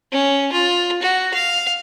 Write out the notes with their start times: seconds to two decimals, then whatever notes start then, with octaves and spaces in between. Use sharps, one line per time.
0.12 C#4
0.52 F4
1.02 F#4
1.34 F5